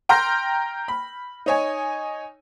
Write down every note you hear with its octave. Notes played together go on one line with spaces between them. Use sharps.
G5 A#5 C6 F6 G6 A#6
B5
D#4 C#5 G#5